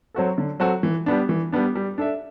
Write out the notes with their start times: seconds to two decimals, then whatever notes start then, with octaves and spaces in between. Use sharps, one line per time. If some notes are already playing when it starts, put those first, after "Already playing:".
0.14 F#3 C4 F#4 A4
0.38 D3
0.60 F#3 C4 F#4 A4
0.83 E3
1.06 G3 B3 D4
1.29 E3
1.52 G3 B3 D4
1.75 G3
1.98 D4 A4 E5